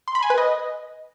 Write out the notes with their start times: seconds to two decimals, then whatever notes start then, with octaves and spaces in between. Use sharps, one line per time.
0.08 C6
0.15 B5
0.23 G#5
0.30 B4
0.38 D#5